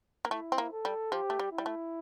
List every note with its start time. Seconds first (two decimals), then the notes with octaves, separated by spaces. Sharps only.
0.25 A#3
0.31 A3 E4
0.52 C4
0.58 A#3
0.72 A4
0.85 G3
1.12 F3 G4
1.30 A3
1.39 G3
1.52 E4
1.58 G3
1.66 A3